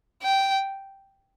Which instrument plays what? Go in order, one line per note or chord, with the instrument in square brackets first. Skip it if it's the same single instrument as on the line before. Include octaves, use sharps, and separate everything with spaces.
[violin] G5